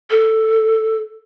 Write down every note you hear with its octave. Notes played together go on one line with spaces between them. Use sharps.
A4